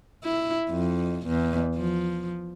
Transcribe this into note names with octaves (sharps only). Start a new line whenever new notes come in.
E4
F2
E2
F3